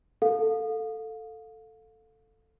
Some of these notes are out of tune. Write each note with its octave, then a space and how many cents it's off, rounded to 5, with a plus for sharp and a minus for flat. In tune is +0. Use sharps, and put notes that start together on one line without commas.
A4 +5 F5 +25